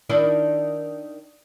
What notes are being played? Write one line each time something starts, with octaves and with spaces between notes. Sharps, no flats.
D#3 D4 E4